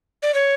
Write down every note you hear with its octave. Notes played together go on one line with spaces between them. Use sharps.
D5
C#5